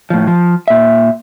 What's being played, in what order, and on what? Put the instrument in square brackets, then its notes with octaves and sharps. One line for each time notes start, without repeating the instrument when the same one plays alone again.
[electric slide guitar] A2 F3
F3
A#2 E5